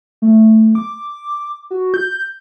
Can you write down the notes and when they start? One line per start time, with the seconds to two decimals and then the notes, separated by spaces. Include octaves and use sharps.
0.22 A3
0.75 D6
1.71 F#4
1.94 G6